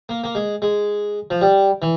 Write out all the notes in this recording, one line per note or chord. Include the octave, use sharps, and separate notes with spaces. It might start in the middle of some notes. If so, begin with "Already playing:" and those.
A#3
A#3
G#3
G#3
F3
G3
E3